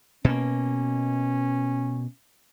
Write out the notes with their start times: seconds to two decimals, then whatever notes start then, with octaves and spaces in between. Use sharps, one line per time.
0.25 B2 A#3 C#4